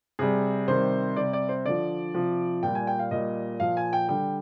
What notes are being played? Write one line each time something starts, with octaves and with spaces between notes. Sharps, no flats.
C3 G3 G#4
C3 D#3 G3 C5
C3 G3 D5
D5
C5
D3 F3 D5
C3 F3
A#2 G3 G5
G#5
G5
F5
A#2 G3 D#5
A#2 F3 F5
G#5
G5
D3 G3 G5